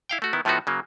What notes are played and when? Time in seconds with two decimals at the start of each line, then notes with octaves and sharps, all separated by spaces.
0.09 E4 F5 G5
0.22 A3 F#4
0.33 D#3 B3 E4
0.45 A2 F3 A3 B3 D#4 F#4
0.67 C#3 F#3 A#3